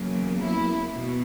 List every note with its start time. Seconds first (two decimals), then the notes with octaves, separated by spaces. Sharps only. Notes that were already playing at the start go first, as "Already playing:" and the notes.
Already playing: E2 C#3 F#3 A#3
0.40 E4
0.93 B2